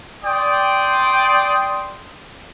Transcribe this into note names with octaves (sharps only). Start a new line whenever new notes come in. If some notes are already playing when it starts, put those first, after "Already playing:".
D5 G5 C6 D#6